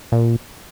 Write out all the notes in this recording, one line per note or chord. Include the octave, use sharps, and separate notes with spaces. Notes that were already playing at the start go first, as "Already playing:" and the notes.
A#2